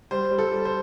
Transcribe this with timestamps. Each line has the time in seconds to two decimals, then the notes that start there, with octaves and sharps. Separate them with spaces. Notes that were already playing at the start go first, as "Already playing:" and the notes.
0.11 G3 C5
0.31 G3
0.38 A4
0.52 G3
0.65 C5